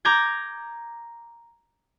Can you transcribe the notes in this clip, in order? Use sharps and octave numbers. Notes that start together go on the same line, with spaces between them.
A#5 D6 G6 G#6